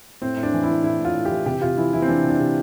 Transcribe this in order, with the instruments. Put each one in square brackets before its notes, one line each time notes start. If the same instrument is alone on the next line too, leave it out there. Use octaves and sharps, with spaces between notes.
[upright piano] A2 C4
A2
D4
E3
E4
E3
A2 E4
A2
F4
A2
E3 G4
C3 G4
C3 F4
E3 E4
E3 E4
C4
E3 D4
C3
D4
C3